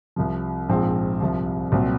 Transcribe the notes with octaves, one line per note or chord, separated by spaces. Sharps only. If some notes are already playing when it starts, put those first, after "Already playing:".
C2 C3 F3
A#1 G#2 F3 C4
C2 C3 F3
C2 A#2 F#3 C4